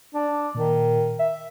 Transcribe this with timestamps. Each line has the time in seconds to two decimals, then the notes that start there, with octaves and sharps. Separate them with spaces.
0.14 D4
0.55 A#2 D#3
1.19 E5